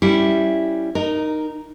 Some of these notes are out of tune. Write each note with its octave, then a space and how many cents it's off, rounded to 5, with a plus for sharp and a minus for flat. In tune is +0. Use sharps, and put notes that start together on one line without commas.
G3 -5 C#4 -5 E4 +0
D#4 -15 A#4 +5